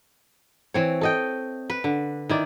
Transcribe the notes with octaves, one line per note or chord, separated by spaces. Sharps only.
E3 C4 C#5
A4 D#5 G5
B4
D3
D#3 E4 D5